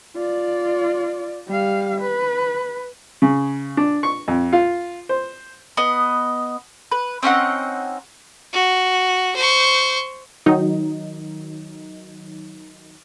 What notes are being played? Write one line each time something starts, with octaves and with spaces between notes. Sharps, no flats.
F4 D5
G3 F5
B4
C#3
D4
C#6
F2
F4
C5
B3 D#5
B4
C4 C#4 D#4 F#5
F#4
C5 C#6
D#3 F#3 D#4